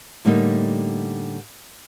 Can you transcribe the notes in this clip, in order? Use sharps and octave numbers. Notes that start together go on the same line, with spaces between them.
A2 D3 G3 A3 A#3 D#4